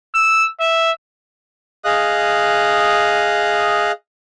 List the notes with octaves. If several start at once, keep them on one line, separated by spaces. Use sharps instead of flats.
E6
E5
G#4 D#5 F5 D#6 F#6